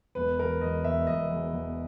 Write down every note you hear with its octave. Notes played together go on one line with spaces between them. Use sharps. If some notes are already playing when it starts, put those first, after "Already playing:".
E1 B4
E2 A#4
E1 D#5
E1 E5
E1 D#5
E2
E2